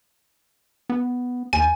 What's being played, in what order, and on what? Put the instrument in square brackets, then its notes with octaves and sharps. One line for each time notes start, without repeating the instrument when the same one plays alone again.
[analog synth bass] B3
[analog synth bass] D#2 [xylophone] G#5